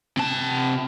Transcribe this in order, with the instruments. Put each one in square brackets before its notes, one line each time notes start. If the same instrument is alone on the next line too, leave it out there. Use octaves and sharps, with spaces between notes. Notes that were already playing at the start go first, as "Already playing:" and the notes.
[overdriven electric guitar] C3 A5